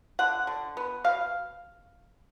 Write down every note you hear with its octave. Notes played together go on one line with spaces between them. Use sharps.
D3 F#5
D3
B3
B2 F5